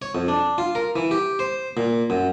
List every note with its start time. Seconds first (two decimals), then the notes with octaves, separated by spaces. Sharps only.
0.02 C#5
0.15 F2
0.28 D4
0.58 F4
0.75 A#4
0.96 E3
1.11 G4
1.39 C5
1.77 A#2
2.10 F#2